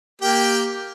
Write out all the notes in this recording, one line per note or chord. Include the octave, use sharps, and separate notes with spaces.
A#3 G4 G5